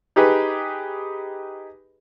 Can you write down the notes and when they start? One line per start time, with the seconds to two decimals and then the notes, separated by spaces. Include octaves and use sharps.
0.16 D#4 G4 G#4 B4